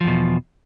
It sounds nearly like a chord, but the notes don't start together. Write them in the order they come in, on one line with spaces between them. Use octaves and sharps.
F3 E2 B2